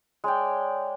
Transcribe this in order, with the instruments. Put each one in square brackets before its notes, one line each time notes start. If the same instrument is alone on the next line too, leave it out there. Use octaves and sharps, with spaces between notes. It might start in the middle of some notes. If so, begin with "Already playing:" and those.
[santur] G#3 C#5 D5 G5